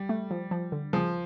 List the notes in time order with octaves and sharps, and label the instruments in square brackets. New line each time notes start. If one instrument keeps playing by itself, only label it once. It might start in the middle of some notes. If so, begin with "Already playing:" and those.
Already playing: [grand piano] G3
[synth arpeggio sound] A3
F3
F3
D3
[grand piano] F3 [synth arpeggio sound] G#4